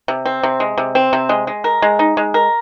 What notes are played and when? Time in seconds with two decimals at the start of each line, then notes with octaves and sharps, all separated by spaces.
0.08 C3
0.26 C4
0.43 C3
0.60 G#3
0.78 C3
0.95 C4
1.13 C3
1.29 G#3
1.47 G#3
1.64 A#4
1.82 G#3
1.99 D#4
2.17 G#3
2.34 A#4